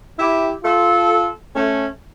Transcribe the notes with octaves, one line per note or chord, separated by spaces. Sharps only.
E4 G4
F4 A4
A3 C#4